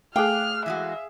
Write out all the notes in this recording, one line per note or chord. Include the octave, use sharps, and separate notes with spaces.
A3 G#4 F5 G5 D6 F6 F#6
E3 G#3 F#4 E5